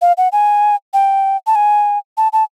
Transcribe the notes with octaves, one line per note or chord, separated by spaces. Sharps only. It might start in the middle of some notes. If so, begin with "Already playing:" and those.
F5
F#5
G#5
G5
A5
G#5
A5
A5